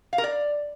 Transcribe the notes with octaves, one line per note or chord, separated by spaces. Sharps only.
F5
A#4
D5